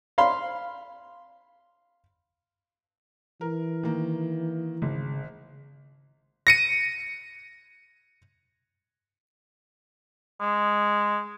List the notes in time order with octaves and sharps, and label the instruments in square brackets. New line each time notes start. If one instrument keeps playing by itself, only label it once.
[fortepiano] F5 B5 C6
[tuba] E3 [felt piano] A#4
[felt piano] D#3 A#3
[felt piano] G#1 [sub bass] C#3
[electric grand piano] A#6 C#7 D#7
[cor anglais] G#3